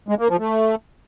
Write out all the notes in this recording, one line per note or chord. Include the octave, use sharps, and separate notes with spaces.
G#3
A#3
F3
A3